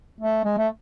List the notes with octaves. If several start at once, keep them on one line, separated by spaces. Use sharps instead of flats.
A3
G#3
A3